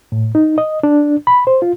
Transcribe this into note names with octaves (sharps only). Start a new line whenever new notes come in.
A2
D#4
D#5
D4
B5
C5
F4